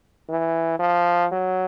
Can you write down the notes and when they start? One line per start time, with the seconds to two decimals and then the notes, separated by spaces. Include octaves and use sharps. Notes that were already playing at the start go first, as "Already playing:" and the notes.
0.29 E3
0.79 F3
1.31 F#3